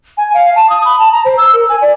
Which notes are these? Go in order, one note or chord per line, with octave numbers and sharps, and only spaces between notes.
G#5
F5
A5
D#6
B5
A5
A#5
C5
E6
A#4
G#5
D5